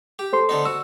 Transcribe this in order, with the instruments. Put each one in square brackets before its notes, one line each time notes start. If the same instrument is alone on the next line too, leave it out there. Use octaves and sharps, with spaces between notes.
[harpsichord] G4
[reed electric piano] A4 C5 C6
[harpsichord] D3 B3 D#4
[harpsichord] F#4 [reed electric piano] E6